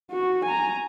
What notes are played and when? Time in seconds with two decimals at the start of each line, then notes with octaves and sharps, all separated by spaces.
0.11 F#4
0.45 G#5 A#5